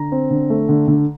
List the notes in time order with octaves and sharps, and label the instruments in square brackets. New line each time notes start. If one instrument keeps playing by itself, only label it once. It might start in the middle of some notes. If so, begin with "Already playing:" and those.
Already playing: [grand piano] D3 A#5
C4
D3
A3
D3
D3